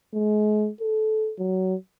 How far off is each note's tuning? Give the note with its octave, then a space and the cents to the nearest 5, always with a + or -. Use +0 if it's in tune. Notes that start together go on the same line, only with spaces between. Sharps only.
G#3 +35
A4 -20
F#3 +15